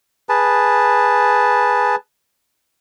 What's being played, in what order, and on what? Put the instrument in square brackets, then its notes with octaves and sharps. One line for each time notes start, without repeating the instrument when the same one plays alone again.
[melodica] G#4 B4 A5